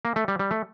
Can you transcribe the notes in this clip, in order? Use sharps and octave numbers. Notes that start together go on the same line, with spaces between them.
A#3
A3
G3
G3
A3